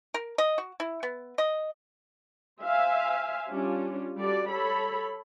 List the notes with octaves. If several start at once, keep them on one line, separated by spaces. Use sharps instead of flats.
A#4
D#5
F#4
E4
B3
D#5
C5 E5 F5 G#5
G3 C#4 D4 F4
G3 F#4 A4 D5
A4 C#5 B5